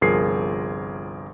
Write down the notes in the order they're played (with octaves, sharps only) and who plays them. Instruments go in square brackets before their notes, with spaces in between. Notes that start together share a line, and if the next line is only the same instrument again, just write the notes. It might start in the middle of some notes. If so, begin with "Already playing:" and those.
[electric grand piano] G1 C2 F3 G#4 A#4 C7